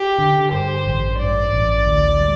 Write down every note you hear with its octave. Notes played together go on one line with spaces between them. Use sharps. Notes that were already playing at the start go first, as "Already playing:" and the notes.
Already playing: G4
D3
G2 C5
A1
G2 D5
A1
D2
G3